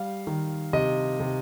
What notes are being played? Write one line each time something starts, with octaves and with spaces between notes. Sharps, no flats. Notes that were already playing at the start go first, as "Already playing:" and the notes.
Already playing: G3 F5
D#3
C3 D#5
C3